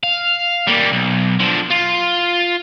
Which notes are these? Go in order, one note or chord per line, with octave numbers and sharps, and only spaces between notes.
F5
G3 A#3
B1
D3 F3
F4